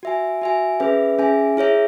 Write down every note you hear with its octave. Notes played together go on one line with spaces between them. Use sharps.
F#4 E5 G#5
F#4 E5 G#5
C#4 G#4 B4 E5
C#4 G#4 E5 G#5
E4 G#4 C#5 E5